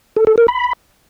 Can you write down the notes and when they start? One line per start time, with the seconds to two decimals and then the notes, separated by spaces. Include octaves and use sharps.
0.16 A4
0.27 A4
0.38 A#4
0.48 B5